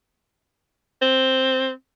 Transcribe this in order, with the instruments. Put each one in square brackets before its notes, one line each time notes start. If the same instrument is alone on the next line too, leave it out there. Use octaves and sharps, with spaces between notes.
[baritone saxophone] C4